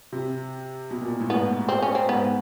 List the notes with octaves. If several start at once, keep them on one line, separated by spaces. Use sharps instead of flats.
C3
B2
A#2
A2
G#2 B3
C4
C#4
C4
G#2 B3